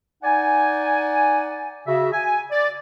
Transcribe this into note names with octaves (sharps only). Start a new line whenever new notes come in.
D#4 D5 F#5 G#5
C#3 F#4 E5
G#5
D5